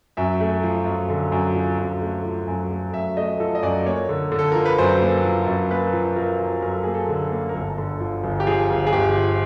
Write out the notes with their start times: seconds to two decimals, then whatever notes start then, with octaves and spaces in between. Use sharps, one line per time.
0.17 F#2 E5
0.40 A3
0.63 F3
0.87 F#2
1.10 D3
1.32 F#2
1.55 F3
1.78 F#2
2.02 A3
2.25 F3
2.48 F#2
2.71 A3
2.94 F#2 E5
3.17 A3 D#5
3.40 F3 A4
3.55 D#5
3.63 F#2 D5
3.86 A#3 C#5
4.09 D3
4.32 D3
4.39 A4
4.52 F3 A#4
4.65 B4
4.78 F#2 C5
5.02 A#3
5.24 F3
5.47 F#2
5.70 A#3 B4
5.93 F3
6.16 F3 A#4
6.39 F3
6.62 F#2 A#4
6.73 A4
6.83 A#3 G#4
6.94 A4
7.09 D3
7.32 A#3
7.49 A#4
7.54 G1 A4
7.78 D3
8.00 F3
8.24 G1
8.40 G4
8.47 F3 G#4
8.70 G1
8.87 G#4
8.93 G1 G4
9.16 F3